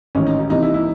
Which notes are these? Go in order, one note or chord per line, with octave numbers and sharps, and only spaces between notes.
A1 G#2 D#3 C#4
D#4
D#4
C2 C3 E3 D#4
E4
E4